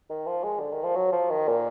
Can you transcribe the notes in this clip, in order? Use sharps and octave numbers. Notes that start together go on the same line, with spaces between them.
D#3
F3
G#3
D3
D#3
F3
F#3
F3
D#3
A#2